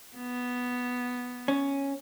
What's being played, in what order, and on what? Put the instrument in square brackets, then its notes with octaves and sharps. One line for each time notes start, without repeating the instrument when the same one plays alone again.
[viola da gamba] B3
[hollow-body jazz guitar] C#4